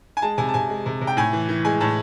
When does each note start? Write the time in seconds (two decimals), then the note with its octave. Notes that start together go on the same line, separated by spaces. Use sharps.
0.17 G#5
0.22 G#3 A5
0.38 C3 G#5
0.49 A5
0.54 C3 G#5
0.69 G#3
0.86 C3
1.01 C3
1.07 G5
1.17 A2 G#5
1.33 E3
1.49 E3
1.65 G#3 G#5
1.80 A2 A5